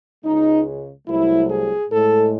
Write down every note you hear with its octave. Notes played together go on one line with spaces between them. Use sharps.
C#2 C#3 G#3 D#4
C2 C3 F#3 A3 E4
G#4
A2 G#3 A4